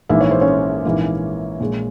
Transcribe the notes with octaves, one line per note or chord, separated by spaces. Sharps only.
A#1 G#2 E3 A#3 E5
C#5
C5
C#4 C#5
A#1 G#2 E3 A#3
A#1 A#2 G#3